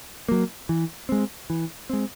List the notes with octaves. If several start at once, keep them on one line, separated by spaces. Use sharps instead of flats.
F#3 A#3
E3
G#3 C4
E3
G#3 C4